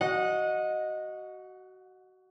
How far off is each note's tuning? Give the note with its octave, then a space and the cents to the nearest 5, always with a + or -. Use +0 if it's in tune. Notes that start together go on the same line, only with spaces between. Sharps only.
F#4 +20 D#5 +0 F#5 -25